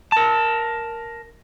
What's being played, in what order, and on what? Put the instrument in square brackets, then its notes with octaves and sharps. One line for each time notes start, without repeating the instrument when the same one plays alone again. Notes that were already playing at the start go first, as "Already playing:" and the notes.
[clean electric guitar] A#4 A5